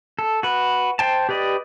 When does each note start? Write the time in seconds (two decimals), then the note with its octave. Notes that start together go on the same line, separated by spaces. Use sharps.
0.19 A4
0.43 F#4 B4
0.99 C5 G5 A5
1.29 G4 B4 D5 D#5